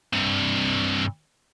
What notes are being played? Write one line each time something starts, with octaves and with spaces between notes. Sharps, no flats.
G2 C3